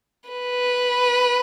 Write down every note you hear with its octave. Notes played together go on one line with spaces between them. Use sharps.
B4